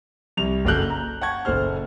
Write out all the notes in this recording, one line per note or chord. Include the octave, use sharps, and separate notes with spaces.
C2 F7
F#1 F#2 A#3 A4 F#6 G6
A#5
F#5 G5 A5 C#6 G#6
F#1 A#2 A4 C5 F6